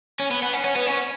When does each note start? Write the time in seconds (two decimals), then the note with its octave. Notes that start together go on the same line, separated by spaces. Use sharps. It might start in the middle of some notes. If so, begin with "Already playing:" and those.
0.20 C#4
0.31 B3
0.42 B3
0.53 C#4
0.64 C#4
0.76 B3
0.86 C#4